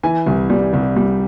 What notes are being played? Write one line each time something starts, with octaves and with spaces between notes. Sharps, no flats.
E3 G#5
C2
G3
C2
G3